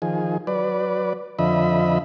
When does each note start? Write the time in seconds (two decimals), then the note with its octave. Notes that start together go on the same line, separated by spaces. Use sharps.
0.02 D#3 F3 G#4
0.47 F#3 B4 D5
1.39 F2 D3 F3 D#5 E5 B5